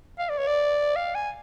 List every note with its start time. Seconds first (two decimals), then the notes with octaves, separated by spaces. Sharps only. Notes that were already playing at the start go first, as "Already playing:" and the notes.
0.19 F5
0.29 D5
0.38 C#5
0.48 D5
0.96 F5
1.15 G#5